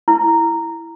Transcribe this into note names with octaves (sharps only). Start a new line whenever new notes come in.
E4